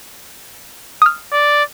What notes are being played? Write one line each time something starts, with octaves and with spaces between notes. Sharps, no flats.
D#6 F6
D5